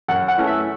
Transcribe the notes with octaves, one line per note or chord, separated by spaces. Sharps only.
F#2 F#5
F#5
E3 A3 C#4
E5